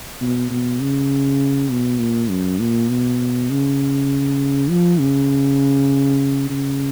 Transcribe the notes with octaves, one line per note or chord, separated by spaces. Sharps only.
B2
B2
C#3
B2
A#2
F#2
A#2
B2
C#3
F3
C#3
C#3